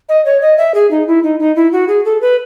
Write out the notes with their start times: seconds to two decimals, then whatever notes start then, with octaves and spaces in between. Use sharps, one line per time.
0.09 D#5
0.25 C#5
0.42 D#5
0.58 E5
0.75 G#4
0.91 D#4
1.07 E4
1.23 D#4
1.40 D#4
1.56 E4
1.72 F#4
1.88 G#4
2.05 A4
2.21 B4